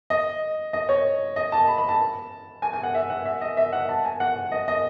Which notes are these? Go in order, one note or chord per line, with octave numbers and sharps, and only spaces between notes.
D#5
D#5
C#5
D#5
A5
B5
B5
A5
G#5
G#5
F#5
E5
F#5
E5
D#5
E5
F#5
A5
G#5
F#5
D#5
D#5